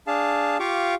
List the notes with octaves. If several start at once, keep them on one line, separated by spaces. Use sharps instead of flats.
D4 G#4 F5 A5
F4 G4 F5 C#6 D6